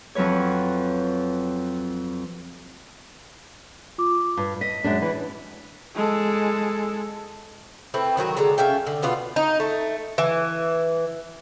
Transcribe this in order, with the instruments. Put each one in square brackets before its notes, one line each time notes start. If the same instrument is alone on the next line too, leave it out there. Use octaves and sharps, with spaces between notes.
[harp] F2 F3 F#3 B4 C#5
[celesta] F4 D6
[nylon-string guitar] G2
[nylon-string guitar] D#5 [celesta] B6
[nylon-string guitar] F#2 G#3 D4
E3
[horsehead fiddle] G#3 A4
[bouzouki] A3 C4 E4 B4
D#3 F#3 F#4 A#4
D3 G#3 A4 A#5
C#4 F4 E5 G5
D3
B2 B3 F4 D5
D#4
A3
E3